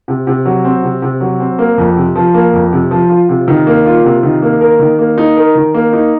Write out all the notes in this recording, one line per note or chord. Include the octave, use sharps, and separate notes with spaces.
C3
C3
F#3
C4
C3
C3
F#3
C4
A#3
F2
C3
F3
A#3
F2
C3
F3
F4
C3
D#3
A#3
F4
C3
D#3
A#3
A#4
D#3
A#3
D#4
A#4
D#3
A#3
D#4